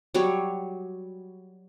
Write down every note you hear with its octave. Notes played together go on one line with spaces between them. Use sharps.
F#3 G3 C#5